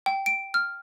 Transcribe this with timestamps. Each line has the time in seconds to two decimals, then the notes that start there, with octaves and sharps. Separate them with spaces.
0.06 G5
0.26 D7
0.54 F6